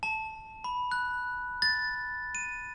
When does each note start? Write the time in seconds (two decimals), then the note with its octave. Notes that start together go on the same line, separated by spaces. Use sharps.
0.03 A5
0.64 B5
0.91 F#6
1.62 A6
2.35 D#7